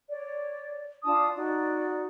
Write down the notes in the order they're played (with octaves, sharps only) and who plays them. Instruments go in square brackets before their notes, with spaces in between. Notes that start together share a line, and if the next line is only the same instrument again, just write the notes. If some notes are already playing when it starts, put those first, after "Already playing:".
[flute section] C#5 D5
D4 F4 A5 D#6
D#4 F#4 D5